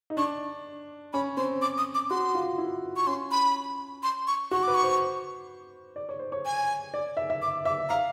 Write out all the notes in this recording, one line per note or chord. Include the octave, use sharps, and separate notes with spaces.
D#4
D4 C#6
C#4 B5
C4 C6
D6
D#6
D6
F#4 C6
F4
E4
C#6
C#4 C6
B5
C6
C#6
F#4 C#6
B4 D6
C#6
C5
D5
C#5
C5
C#5
G#5
D5
E5
E5
D6
E5 D6
F5 A#5